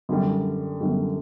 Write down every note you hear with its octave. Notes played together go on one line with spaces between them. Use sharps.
F#2 D3 G3
F#2 D3 G3